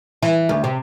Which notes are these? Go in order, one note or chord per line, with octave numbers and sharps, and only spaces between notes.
E3
D2
C3